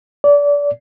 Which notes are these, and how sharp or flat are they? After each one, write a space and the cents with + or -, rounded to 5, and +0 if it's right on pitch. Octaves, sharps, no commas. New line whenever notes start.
D5 -25